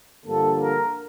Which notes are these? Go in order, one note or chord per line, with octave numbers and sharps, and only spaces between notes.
G2 D3 F3 A#3 A4
A#4